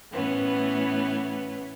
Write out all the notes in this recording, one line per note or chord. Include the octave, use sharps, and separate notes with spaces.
A2 E3 B3 C#4